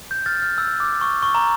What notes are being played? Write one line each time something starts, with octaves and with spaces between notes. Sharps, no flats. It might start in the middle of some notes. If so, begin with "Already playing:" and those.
G6
F6 A6
F6
E6
D6
C#6
C#6
A#5